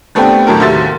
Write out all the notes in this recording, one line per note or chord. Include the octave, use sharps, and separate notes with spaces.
G3 A3 B3 C4 D4 G4
G1 A2 F#3 A4 A#4
D#2 C3 F#4 E5 C6 A6